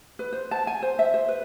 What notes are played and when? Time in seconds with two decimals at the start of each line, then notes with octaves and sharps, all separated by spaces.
0.19 B4
0.33 C5
0.51 A5
0.67 G#5
0.82 C5
0.99 E5
1.14 C5
1.28 B4